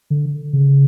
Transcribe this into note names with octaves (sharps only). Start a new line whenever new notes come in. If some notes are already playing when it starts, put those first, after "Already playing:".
D3
C#3